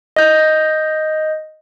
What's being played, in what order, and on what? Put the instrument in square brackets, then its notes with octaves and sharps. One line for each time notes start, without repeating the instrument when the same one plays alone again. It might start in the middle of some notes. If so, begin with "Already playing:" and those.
[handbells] D#5 G6